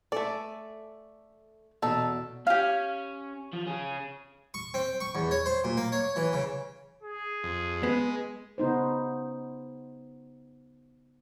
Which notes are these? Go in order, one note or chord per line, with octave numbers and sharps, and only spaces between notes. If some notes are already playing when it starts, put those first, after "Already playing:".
A3 A4 D5 G#5
E2 B2 D#4 A4
C#4 G4 F5
F3
C#4 G#4
C#6
C4
C#6
E2
C#5
C5
A#2
A#3
C#5
E3
C#3
G#4
F2
G#3 B3
C#3 B3 D#4 C5